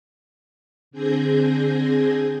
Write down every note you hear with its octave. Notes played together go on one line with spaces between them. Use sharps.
D3 C4 G#4 G6 G#6 A#6